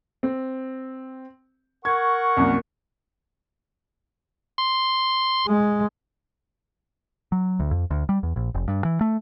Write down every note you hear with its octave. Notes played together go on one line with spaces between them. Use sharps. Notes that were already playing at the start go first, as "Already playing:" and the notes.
C4
A#4 F#5 C#6 G#6
C2 F#2 A#3
C6
G#3
F#3
D2
F2
D2
G3
E2
A#1
F1
G2
E3
A3